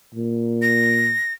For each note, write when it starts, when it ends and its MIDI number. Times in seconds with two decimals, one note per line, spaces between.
0.15 1.14 46
0.62 1.33 94